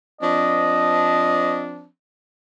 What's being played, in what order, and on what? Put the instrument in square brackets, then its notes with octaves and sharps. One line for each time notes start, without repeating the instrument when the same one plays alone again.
[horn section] F3 C4 D4 [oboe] D#5